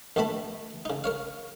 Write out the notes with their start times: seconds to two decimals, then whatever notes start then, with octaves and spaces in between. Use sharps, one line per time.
0.16 A#1 D#2 B2 A3 A5 B5
0.85 C#3 D#4
1.04 A#4 C#5 F5